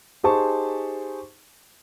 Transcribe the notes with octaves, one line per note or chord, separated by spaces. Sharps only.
D#4 G4 G#4 C5 A5 C#6